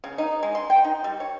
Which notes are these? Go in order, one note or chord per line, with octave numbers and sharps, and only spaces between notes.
C#3
D#4
G#3
C6
G5
D#4
G3
C#5